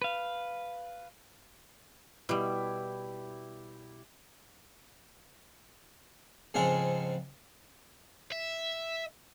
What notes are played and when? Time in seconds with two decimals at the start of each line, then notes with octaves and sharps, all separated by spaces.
0.02 B4 F5
2.29 B2 G3 E4 G4
6.54 F2 G#2 C#3 G#3 F4 A4
8.32 E5